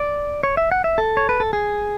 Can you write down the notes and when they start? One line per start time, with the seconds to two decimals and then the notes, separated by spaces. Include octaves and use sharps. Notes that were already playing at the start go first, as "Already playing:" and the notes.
Already playing: D5
0.43 C#5
0.57 E5
0.72 F#5
0.84 E5
0.98 A4
1.17 C#5
1.29 B4
1.40 A4
1.53 G#4